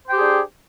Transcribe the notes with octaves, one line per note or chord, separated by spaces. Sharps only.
D4 G4 G#4 C5 G5